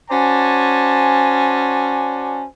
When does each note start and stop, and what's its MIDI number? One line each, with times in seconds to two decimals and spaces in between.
0.11 2.44 61
0.11 2.44 66
0.11 2.44 72
0.11 2.44 74
0.11 2.44 80
0.11 2.44 81